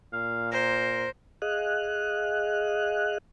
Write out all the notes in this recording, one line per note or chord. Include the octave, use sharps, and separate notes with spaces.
A#2 F5
A#4 C5
G#4 D#5 F5 F#6